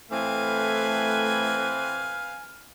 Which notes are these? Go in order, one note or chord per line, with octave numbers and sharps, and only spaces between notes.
A2 E3 A3 C4 B4 F5 G#5